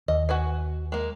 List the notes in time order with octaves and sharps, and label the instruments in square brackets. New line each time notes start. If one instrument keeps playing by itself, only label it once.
[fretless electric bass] D#2 [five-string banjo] D#5
[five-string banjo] F#4 B4 G#5
G#3 A#3